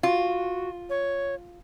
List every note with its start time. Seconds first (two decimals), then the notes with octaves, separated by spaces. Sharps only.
0.03 F4 F#4
0.90 C#5